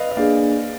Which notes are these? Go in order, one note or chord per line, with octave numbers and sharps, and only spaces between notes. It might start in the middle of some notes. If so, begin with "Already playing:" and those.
Already playing: B4 D5 D#5 F5
D#5
A#3 D4 G#4 D5 F5